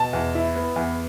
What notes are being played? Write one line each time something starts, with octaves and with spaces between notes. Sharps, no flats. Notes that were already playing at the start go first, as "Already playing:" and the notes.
Already playing: B2 A5
E2
E4
B3
E2